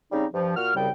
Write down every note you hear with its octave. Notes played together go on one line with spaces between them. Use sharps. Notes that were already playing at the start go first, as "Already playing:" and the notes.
C#3 G3 C4 D#4
G2 F3
A#2 F#4 F6
C2 F#2 C#3 G3 G5